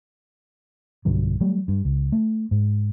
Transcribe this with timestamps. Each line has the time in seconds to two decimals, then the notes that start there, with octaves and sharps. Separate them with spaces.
1.05 B1 G2 D3 F#3
1.40 F#3 G3 A3
1.68 G2
1.85 C#2
2.12 A3
2.51 G#2